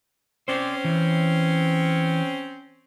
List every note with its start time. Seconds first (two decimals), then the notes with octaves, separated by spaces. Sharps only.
0.48 C4 C#4 C5 D5
0.84 E3